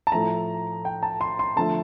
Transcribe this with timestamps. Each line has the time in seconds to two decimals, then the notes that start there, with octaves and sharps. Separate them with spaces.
0.07 A5
0.12 A2 F3 A3 A#5
0.85 G5
1.03 A5
1.21 C6
1.39 C6
1.56 D3 F3 A3 A5